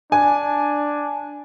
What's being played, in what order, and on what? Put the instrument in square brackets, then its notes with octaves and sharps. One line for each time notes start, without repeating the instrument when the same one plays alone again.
[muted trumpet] D4 [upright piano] G#5